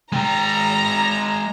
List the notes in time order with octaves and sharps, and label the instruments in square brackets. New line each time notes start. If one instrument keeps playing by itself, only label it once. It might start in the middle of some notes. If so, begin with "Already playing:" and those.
[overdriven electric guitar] G#3 G5 [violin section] A#5